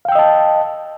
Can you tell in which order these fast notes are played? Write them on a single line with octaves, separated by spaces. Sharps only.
F5 G5 E6 D#5 A5